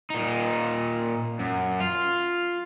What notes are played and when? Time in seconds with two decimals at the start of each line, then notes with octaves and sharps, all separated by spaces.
0.10 A#2 D#4
1.40 F#2
1.81 F4